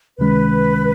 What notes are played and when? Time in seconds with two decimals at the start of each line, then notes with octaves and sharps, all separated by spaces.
0.18 C#2 C3 D#3 G#3 C#4 B4